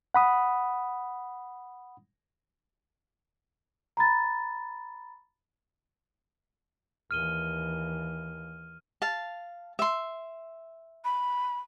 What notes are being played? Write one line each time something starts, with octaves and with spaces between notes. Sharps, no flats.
F#5 B5 D#6
A#5 B5 A6
D#2 E3 F6 D#7 G7
F5 A5
E5 C6
B5